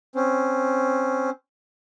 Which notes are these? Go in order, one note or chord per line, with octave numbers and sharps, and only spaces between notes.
C4 C#4